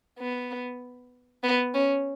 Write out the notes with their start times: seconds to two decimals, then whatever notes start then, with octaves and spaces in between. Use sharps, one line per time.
0.19 B3
1.43 B3
1.74 C#4